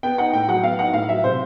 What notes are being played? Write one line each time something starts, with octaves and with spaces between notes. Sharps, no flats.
B3 G5
D#4 F#5
A2 G5
F#3 F#5
B3 F5
D#4 F#5
A2 F5
F#3 E5
C3 C5